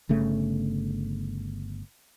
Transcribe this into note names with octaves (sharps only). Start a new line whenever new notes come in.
G1 C#3 A3